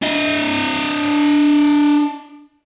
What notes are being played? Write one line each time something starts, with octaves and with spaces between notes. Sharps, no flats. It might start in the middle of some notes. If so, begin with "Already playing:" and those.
D4 D#5